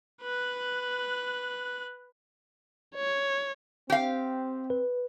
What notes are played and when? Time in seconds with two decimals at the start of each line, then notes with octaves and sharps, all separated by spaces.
0.22 B4 F#6
2.95 C#5
3.90 C4 G4 F5
4.70 B4